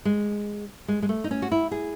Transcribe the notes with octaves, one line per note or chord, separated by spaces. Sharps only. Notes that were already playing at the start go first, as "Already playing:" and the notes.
G#3
G#3
G#3
A3
D#4
C#4
F#4
E4
G#4